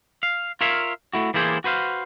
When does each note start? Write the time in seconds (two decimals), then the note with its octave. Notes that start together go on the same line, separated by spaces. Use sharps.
0.23 F5
0.61 F4 A#4 C#5 E5 F5
1.13 A3 E4 F#4
1.34 E3 G3 A#3 E4 G#4 C5
1.64 F#4 B4 C5 F5